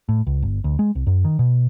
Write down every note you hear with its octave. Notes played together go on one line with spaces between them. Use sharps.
A2
C#2
G1
D2
G#3
C2
F#2
D#3
B2